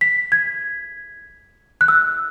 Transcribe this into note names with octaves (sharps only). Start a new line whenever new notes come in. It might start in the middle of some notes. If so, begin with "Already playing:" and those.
B6
G#6
F#6
E6